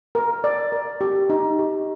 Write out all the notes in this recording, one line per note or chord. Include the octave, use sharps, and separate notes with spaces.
A#4
D5
A#4
G4
D#4
G4